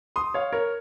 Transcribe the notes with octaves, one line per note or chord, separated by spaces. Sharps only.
C6 D#6
C#5 F5
A#4 C#5